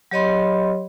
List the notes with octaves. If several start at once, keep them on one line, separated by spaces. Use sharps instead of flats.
F#3 G4 C#5 D#5 B5 C6